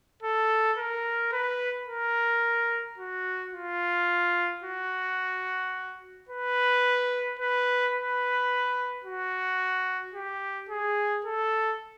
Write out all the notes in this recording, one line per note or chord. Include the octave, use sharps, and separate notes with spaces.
A4
A#4
B4
A#4
F#4
F4
F#4
B4
B4
B4
F#4
G4
G#4
A4